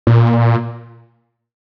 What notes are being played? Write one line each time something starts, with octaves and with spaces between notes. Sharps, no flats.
A#2